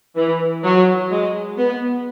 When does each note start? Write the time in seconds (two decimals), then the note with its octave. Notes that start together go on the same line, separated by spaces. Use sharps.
0.17 E3
0.64 F#3
1.11 G#3
1.58 B3